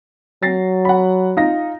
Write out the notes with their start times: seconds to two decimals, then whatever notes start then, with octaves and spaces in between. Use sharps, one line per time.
0.43 F#3 A6 A#6 C7
0.85 F#5 B5
1.37 D#4 F4 A#6